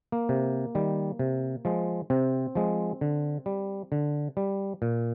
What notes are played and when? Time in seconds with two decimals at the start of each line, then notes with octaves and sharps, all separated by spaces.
0.12 A#3
0.29 C3
0.75 D#3 G3
1.19 C3
1.65 F3 G#3
2.10 C3 C4
2.55 F3 G#3
3.01 D3
3.46 G3
3.92 D3
4.37 G3
4.82 A#2